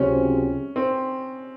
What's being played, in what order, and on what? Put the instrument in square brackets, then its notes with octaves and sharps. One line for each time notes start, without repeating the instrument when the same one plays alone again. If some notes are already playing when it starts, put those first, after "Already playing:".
Already playing: [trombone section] C#2 C3 F#3 C4 [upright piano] C#4
[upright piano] C4